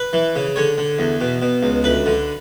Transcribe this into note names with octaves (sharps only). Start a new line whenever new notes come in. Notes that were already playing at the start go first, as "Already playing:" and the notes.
Already playing: B4
E3
C#3
D3 C#5
D3
E2
B2
B2
C#2
D2 B4
D3